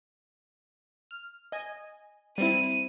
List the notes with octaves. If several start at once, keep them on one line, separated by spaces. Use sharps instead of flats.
F6
D#5 G#5
G3 C4 E4 D#7